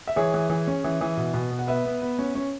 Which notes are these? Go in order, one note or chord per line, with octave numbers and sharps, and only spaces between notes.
E5
E3 G#4 C#5
E3
E3
C#4
E3
E3
B2
B2
B3
F#5
B3 B4 E5
B3
B3
C#4
C#4